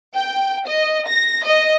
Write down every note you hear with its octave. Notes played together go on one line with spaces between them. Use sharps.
G5
D#5
A#6
D#5